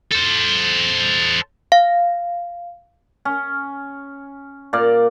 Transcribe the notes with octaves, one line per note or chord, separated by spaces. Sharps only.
A4 C5
F5
C#4
A#2 D5 F5